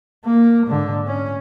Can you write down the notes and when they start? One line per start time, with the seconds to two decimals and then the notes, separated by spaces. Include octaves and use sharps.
0.25 A#3
0.66 G#2 D3
1.07 C#4